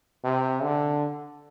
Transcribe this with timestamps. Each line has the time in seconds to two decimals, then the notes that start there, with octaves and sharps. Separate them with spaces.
0.24 C3
0.63 D3